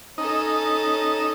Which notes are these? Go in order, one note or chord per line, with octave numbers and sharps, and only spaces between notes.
C#4 D#4 A4